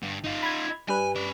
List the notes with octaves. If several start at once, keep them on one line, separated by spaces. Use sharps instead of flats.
G1 G2
D#4 F4
B5 G#6
G2 G3 B4 G#5
C#4 D5